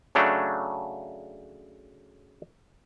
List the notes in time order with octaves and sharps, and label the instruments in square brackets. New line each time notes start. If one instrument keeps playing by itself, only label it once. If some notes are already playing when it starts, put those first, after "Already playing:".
[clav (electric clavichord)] C#3 F#3 A3 D4